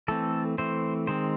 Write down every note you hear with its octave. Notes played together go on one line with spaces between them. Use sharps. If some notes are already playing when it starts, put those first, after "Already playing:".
E3 A3 C4 A4
E3 A3 C4 C5
D#3 G#3 C4 C5